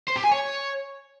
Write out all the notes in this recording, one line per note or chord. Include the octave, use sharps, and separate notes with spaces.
C5
G4
G#5
C#5